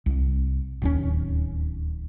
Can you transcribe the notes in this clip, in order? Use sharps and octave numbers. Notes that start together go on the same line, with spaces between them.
C2
D1 D#2 C#4